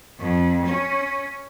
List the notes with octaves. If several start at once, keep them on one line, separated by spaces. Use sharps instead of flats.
F2
C#4